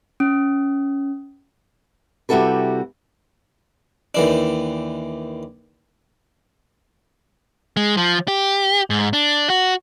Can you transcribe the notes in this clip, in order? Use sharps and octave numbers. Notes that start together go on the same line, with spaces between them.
C#4
C3 G3 E4 F#4 A4 B4
D#2 E3 D4
G#3
F3
G4
G#2
D4
F#4